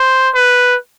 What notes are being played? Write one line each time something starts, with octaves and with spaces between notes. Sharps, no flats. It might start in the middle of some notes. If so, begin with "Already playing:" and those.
Already playing: C5
B4